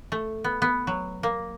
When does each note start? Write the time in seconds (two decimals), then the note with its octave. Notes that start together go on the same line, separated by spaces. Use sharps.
0.12 A3
0.44 B3
0.62 B3
0.87 F#3
1.23 A#3